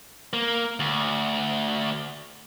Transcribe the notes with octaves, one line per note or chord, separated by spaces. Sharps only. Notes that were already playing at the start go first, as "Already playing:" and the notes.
A#3
D2